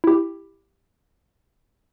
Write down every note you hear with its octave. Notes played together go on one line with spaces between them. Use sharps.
E4 G4